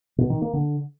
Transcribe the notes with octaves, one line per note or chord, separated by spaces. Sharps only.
B2
D#3
A#3
D3